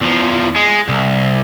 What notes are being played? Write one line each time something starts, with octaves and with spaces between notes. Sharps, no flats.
E2 F3
G#3
C2